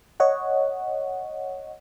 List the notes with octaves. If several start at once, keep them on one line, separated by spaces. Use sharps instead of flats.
C#5 D#5 F#5